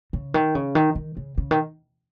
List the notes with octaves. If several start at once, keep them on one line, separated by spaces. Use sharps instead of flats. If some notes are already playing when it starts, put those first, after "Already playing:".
C#3
D#3
C#3
D#3
D#3
C#3
C#3
D#3